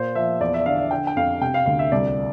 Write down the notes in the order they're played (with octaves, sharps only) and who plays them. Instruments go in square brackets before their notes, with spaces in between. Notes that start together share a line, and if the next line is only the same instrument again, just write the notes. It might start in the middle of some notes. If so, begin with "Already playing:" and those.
Already playing: [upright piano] A#2 C5
F3 E5
E2 D5
E5
D3 F5
E5
D3 G5
G5
F2 F5
C3 G5
F5
D2 F5
E5
C2 D5